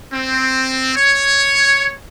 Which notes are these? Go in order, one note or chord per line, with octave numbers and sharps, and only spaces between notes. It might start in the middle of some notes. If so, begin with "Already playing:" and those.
C4
C#5